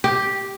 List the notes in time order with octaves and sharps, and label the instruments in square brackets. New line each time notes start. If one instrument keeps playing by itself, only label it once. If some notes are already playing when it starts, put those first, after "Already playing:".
[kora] G4